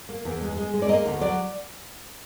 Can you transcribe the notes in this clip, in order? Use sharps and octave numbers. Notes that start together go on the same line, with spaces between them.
A#3
E2
G#3
G#3
G#3
D5
A#3 D#5
D2
F#3 D5